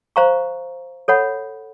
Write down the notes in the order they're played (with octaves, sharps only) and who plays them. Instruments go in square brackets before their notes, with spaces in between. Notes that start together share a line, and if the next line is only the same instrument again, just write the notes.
[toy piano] C5 F5 A#5 C#6
A4 C#5 F#5 B5